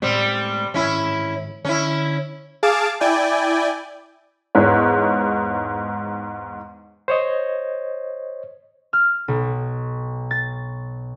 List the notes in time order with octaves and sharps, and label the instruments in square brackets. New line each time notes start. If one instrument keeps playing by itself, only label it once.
[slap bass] A2 G#3 B3 [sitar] G3 C4
[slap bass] G#2 D#3 E3 [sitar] C#4 E4
[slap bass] D3 [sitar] C#4 E4
[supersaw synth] G#4 F5 A5 D6 A6 D7
E4 D5 G5 G#5
[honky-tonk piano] E2 G#2 C#5
[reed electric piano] C5 C#5 D#5
[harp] F6
B1
A6